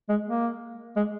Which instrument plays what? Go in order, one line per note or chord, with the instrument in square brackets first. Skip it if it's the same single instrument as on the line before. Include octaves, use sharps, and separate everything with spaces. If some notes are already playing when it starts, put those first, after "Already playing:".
[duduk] G#3
A#3
G#3